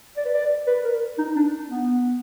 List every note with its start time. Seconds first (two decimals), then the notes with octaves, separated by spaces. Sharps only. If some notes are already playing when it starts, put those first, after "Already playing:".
0.17 D5
0.25 B4
0.34 D5
0.67 B4
0.85 A#4
1.18 D#4
1.36 D4
1.70 B3